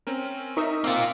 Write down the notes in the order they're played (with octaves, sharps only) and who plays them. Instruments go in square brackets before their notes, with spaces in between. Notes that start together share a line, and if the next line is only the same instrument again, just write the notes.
[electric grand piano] C4 C#4 A#4
[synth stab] D#4 A#4 E5 [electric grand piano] C#6 D#6
[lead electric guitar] A#3 F4 [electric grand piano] C4 E6